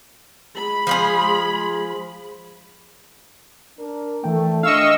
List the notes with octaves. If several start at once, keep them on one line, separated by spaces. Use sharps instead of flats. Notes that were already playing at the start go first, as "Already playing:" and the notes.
G#3 B5
F3 F4 G#4
D4 A#4
E3 A3 G5
D4 D#5 F5 C#6 E6